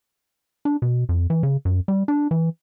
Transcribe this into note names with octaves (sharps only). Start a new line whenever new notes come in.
D4
B2
F2
E3
C#3
F#2
G3
D4
E3